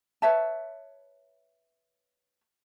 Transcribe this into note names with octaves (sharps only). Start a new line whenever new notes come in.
B4 C#5 E5 A5